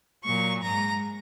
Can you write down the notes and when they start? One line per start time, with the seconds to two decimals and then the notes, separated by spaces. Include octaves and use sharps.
0.25 A#2 F#3 C#6
0.63 G#2 G#3 A#5